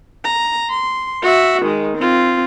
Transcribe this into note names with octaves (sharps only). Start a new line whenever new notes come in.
A#5
C6
F#4 E5
D#3 G#3
C4 F4